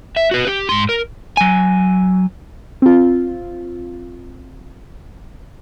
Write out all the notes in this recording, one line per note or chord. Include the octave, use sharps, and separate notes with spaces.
E5
F#4 B4
G4
G#2 C6
A#4
F#3 G#5
C4 F4